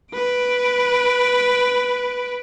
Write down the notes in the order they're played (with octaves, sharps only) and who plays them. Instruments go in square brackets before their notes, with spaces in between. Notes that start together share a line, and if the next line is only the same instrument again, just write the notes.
[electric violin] B4 D7